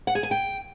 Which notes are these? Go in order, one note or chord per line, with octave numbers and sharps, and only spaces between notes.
F#5
G#4
G#5
G5